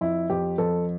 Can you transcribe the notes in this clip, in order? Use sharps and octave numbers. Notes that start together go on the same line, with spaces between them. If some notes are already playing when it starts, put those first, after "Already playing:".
F2 E4
F2 G4
F2 A4